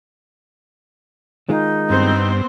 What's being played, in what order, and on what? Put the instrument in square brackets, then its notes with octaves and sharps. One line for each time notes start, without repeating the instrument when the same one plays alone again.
[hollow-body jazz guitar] D#3 G#3 F4 [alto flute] D#4
[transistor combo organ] G2 [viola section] B3 C4 C5